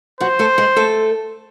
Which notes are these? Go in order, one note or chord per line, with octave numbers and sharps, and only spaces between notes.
F#3 F#4 C5
A3 A4
G#3 G#4
A3 A4